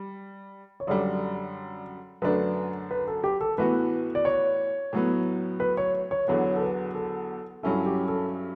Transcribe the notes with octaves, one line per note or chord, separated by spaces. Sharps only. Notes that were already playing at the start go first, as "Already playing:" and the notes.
Already playing: G3
C#5
F#2 D3 G3 D5
F#2 D3 A3 D4 B4
B4
A4
G4
A4
A2 E3 B3 F#4 B4
D5
C#5
A2 F#3 B3
B4
C#5
C#5
E2 D3 F#3 B3 C#5
A4
B4
A4
G2 F#3 C#4 E4 A4
G4
A4